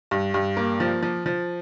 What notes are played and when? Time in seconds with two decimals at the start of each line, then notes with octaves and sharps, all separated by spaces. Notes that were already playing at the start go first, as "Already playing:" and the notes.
0.11 G2
0.34 G2
0.57 A#3
0.80 F3
1.03 F3
1.26 F3